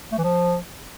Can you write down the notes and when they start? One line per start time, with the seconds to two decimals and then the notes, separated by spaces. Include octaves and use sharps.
0.12 A3
0.18 E3
0.24 F3